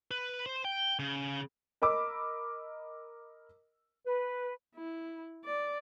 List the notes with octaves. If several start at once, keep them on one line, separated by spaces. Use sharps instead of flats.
B4
C5
G5
C#3
A#4 D#5 B5 D6 E6
B4
E4
D5